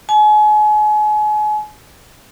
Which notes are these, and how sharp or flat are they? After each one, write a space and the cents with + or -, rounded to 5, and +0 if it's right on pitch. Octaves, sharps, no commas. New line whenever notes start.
G#5 +35